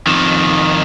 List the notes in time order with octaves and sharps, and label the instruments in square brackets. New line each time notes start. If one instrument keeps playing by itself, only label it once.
[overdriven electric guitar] F2 D#3